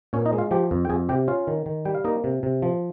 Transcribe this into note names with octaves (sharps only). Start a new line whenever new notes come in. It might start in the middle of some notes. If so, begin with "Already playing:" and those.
A#2 C#4 C#5
D#4 D#5
G#3
F4 F5
F3 G4 G5
F2
G5
F2 G#4 G#5
C3 G4 G5
C#4 F4 F5
D#3
D#3
G3 G5
F5
A#3 D#4 D#5
C3
C3
F3